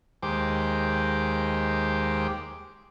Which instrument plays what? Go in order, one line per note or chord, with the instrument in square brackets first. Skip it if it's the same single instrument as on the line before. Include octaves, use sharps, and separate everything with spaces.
[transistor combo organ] D#2 G#3 G4 C5 D6